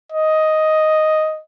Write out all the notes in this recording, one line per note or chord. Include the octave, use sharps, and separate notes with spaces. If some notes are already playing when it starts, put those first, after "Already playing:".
D#5